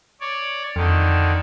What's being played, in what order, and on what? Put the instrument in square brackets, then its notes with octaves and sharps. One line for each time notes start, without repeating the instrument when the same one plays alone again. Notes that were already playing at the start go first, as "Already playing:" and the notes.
[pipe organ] C#5 D5
[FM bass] F2 [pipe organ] D3 D#3